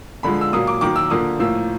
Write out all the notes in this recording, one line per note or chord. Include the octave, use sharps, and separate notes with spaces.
D3 F3 G#3 B5
E6
A#2 F#3 A#3 D#6
D6
D#3 F#3 A#3 D6
E6
D3 F3 A#3 D#6
A2 F3 A#3 E6